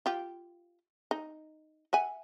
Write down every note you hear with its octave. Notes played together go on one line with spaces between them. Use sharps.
F4 G4
D#4
E5 F#5 G#5